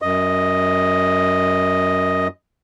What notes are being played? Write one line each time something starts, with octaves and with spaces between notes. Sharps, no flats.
F#2 D#5